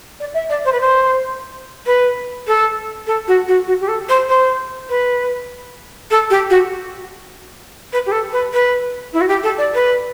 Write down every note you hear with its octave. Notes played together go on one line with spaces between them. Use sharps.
D5
E5
D5
C5
B4
C5
B4
A4
A4
F#4
F#4
F#4
G4
A4
C5
C5
B4
A4
G4
F#4
B4
G4
A4
B4
B4
E4
F#4
G4
A4
D5
B4